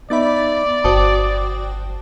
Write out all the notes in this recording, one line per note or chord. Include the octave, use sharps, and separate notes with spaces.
B3 D#4 D5 E5 B5 D6 A6
G1 F#4 C5 G5 A5 D6 D#6